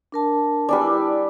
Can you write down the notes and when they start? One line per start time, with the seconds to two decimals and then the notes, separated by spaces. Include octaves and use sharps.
0.12 D4 A#4 A5
0.69 G3 D4 D5 G#5
0.81 E4